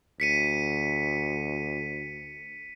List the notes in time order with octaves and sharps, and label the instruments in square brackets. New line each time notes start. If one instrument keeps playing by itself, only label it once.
[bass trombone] D2 [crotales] B6 C#7 D#7